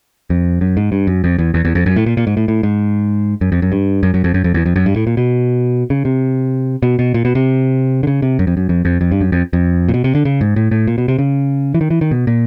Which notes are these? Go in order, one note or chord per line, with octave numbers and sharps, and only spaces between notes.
F2
F#2
G#2
G2
F#2
F2
E2
E2
E2
F2
F#2
A2
A#2
A#2
G#2
A2
A2
G#2
F#2
F2
F#2
G2
F#2
F#2
F2
F#2
F2
E2
F2
F#2
G2
A2
A#2
B2
C#3
C3
B2
B2
A#2
B2
C3
D3
C#3
C3
F#2
F2
F#2
F2
F2
F2
G2
F#2
F2
F2
A#2
B2
C3
D3
C#3
G#2
A2
A2
A#2
B2
C3
C#3
E3
D#3
E3
D#3
B2
A#2